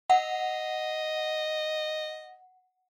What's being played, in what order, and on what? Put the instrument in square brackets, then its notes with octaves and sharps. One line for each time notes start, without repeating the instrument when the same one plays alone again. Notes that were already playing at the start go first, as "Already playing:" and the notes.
[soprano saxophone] D#5 [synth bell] F#5